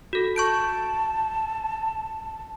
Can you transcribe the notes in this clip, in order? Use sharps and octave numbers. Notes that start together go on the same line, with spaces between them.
F#4 A4
A5 C#6 G6 D7